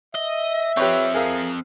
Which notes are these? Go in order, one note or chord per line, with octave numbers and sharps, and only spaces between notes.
D#5 E5
F3 C4 G4 B4 C#5
G#4 A#4 F5